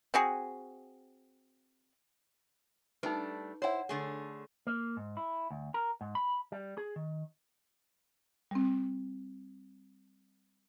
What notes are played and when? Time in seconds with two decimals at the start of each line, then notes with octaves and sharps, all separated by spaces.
0.14 C4 F#4 G#4
3.03 G3 A3 D4 D#4 B4
3.62 E4 C5 C#5 F#5
3.89 D3 A3 G#4
4.67 A#3
4.97 G#2
5.17 E4
5.51 D2
5.74 A#4
6.01 G#2
6.15 B5
6.52 G3
6.77 G#4
6.96 D#3
8.51 G3 C4